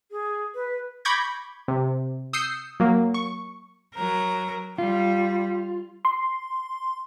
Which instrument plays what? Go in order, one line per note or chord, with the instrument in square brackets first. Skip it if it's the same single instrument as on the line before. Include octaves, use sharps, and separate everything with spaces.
[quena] G#4
B4
[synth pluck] B5 C#6 D6 G6 G#6 A#6
C3
D#6 E6 G6 C7 C#7
F#3 A#3
C#6
[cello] F#3 A#4
[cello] G3 [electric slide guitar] F4
[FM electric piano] C6